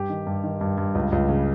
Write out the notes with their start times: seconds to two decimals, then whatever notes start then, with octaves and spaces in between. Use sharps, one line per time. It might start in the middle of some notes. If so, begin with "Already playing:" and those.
Already playing: G2 G4
0.10 D#3
0.27 G2
0.44 D#3
0.61 G2
0.78 G2
0.95 C#2
1.12 C#2
1.29 C#3